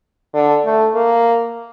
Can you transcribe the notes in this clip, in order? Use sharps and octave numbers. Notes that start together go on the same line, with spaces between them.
D3
A3
A#3